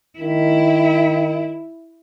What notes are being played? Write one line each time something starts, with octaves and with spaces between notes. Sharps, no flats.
D#3 E4